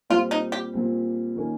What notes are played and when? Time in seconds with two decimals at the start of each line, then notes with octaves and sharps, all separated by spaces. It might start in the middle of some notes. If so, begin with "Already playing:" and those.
0.10 A#2 G3 C4 F4
0.31 D#4
0.52 G4
0.73 A#2 G3 C4
1.36 D#3 A#3 C#4